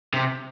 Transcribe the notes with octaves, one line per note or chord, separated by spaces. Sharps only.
C3